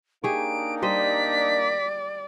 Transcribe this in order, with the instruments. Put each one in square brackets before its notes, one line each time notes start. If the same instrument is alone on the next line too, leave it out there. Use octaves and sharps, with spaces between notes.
[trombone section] A#3 D4 D#4 [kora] G4 G#4 C#5 [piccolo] D7
[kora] G3 C5 D#5 [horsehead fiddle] D5 [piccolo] B6